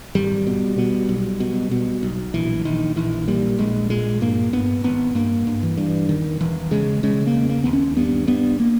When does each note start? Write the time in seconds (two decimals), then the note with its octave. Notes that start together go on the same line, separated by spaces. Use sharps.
0.15 G#1 G3
0.47 B2
0.78 B2
1.09 B1
1.40 B2
1.71 B2
2.03 B1
2.34 A#1 E3
2.65 A#1 D#3
2.96 A#1 E3
3.28 A#2 G3
3.59 A#1 G#3
3.90 A#2 G#3
4.21 G2 A#3
4.53 G2 B3
4.84 G#1 B3
5.15 G2 A#3
5.47 G2
5.63 E3
5.77 G2
6.09 E1 D#3
6.41 E1 E3
6.71 C#3 G#3
7.03 C#3 G#3
7.27 A#3
7.34 E1
7.50 A#3
7.64 D#2 B3
7.73 C#4
7.97 G2 B3
8.27 G2 B3
8.60 A#3